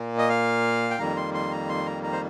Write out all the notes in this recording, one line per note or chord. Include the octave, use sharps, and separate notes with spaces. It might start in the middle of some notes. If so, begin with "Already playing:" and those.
Already playing: A#2 A#3
D#5
F5
G5
F2 D#3 G3 A#3 A#5
C6
C6
A#5
C6
A#5
A#5
C5